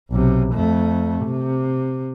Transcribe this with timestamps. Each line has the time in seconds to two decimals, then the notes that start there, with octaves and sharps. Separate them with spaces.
0.10 B1 C3
0.53 F2 A3
1.25 C3